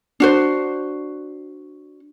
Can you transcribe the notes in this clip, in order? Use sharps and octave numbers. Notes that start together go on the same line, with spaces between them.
D4 F#4 C5